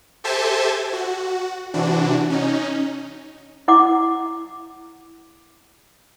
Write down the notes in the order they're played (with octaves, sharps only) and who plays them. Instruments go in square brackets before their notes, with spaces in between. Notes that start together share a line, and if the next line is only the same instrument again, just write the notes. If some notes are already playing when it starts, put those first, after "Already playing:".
[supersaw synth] G4 A4 C5 E5 G#5 A5
F#4
C3 E3 D4 F#4
C#4 D#4
[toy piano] E4 F#5 D6